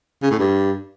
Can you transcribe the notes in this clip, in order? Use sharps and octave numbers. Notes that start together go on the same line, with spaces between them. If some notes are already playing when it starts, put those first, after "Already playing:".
C#3
A2
G2